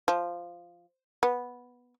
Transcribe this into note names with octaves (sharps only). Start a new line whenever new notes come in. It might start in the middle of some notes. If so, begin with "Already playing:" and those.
F3
B3